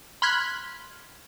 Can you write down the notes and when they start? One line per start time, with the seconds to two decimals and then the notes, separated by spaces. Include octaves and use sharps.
0.22 B5 C6 F6 F#6 G#6 B6